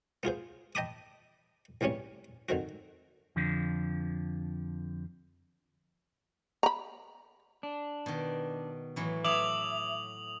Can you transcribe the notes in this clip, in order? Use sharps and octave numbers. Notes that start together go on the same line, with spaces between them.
B3 F4 G#4 C5
D#5 G5 A5 B5 D6 D#6
C2 E3 G3 C#4 C#5
D3 D#3 C4 F#4
F2 D3 F3
A#5 B5
D4
B2 D#3
A2 E3 F#3
F#3 A3 E5 D6 D#6 F7 F#7